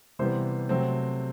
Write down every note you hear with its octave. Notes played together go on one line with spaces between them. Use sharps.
C3 E3 G3 B3 C5
C3 F#3 A3 C4